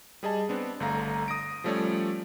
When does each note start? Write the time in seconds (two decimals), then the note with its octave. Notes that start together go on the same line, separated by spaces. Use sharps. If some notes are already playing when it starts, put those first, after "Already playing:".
0.23 G3 G#4 D#5 A5
0.49 B3 C4 D4
0.80 G1 D3 A3 F5 A#5
1.28 D#6 A#6 D7
1.64 F3 G3 A3 C#4 C#5 D5